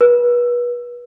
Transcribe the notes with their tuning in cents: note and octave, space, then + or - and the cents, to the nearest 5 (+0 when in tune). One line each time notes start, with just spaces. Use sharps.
B4 -35